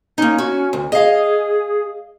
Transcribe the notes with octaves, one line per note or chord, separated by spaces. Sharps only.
A#3 C#4 D#4
F#4
D2
G#4 D#5 F5